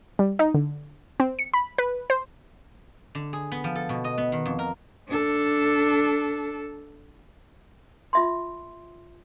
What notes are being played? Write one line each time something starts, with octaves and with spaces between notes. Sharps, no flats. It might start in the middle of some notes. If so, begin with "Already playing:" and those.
G3
D#4
D3
C4
C#7
B5
B4
C5
D3
G#4
B3
F3
A4
B2
D#5
B3
D#3
F2
A#4
D4 A4
F4 E5 C6